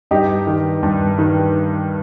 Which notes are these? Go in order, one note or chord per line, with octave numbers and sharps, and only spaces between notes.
G2 D#4 G4
D#3
G2
D#3